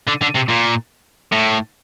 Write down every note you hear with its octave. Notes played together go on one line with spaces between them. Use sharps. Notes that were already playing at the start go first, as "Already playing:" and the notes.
D3
D3
C3
A#2
A2